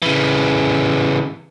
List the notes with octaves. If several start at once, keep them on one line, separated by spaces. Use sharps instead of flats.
C#3 E3